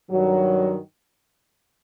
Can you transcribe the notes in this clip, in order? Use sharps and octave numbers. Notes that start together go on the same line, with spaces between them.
G2 D#3 F#3